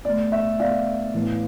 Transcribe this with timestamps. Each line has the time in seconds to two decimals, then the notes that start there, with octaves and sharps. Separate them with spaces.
0.05 B2 A3 D5
0.32 E5
0.60 B2 A3 D5 F5
1.14 A2 E3 B3